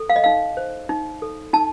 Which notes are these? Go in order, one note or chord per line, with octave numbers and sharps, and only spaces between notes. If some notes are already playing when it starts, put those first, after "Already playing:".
Already playing: A4
F5
D#5
D#4 F5
C5
D#4
A4
D#4 A5